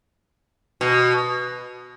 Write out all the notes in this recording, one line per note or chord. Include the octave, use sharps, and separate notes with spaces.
B2